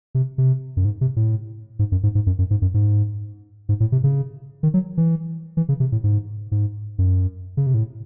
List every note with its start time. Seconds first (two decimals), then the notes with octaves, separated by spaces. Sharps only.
0.15 C3
0.38 C3
0.77 F#2
0.85 G#2
1.01 C3
1.16 A2
1.79 G#2
1.92 F#2
2.03 G#2
2.15 G#2
2.26 F#2
2.38 F#2
2.50 G#2
2.62 F#2
2.74 G#2
3.69 G#2
3.80 A2
3.92 C3
4.04 C#3
4.63 D#3
4.74 F#3
4.97 E3
5.57 E3
5.69 C#3
5.80 C3
5.92 A2
6.04 G#2
6.52 G#2
6.98 F#2
7.57 C#3
7.66 C3
7.74 A2